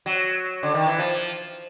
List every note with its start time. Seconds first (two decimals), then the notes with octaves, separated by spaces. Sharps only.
0.06 F#3
0.63 D3
0.74 D#3
0.87 E3
0.98 F3